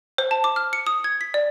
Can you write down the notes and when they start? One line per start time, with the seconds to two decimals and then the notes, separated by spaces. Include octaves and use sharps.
0.18 C5
0.31 A5
0.44 D6
0.56 F6
0.73 C#7
0.87 D#6
1.04 G#6
1.21 B6
1.34 D5